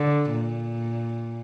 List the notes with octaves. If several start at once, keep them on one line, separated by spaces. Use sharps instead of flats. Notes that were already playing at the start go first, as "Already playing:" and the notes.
Already playing: D3
A#2